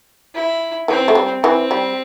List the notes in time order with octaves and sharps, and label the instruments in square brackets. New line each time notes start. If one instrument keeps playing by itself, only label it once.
[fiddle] E4
[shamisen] E3 [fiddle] C4
[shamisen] A3
G3
[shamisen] E3 [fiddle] C4
[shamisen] G3